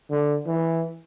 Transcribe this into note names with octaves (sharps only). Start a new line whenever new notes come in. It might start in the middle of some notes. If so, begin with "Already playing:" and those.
D3
E3